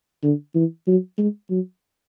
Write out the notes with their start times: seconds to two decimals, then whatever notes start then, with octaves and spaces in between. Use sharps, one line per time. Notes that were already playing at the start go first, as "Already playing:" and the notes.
0.23 D3
0.55 E3
0.87 F#3
1.18 G#3
1.50 F#3